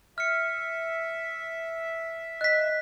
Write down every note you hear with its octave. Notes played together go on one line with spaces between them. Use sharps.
E5 F6 C#7
D#5 F#6 B6